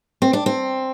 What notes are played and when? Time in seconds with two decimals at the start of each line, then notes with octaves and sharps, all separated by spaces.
0.22 C4
0.33 D4
0.46 C4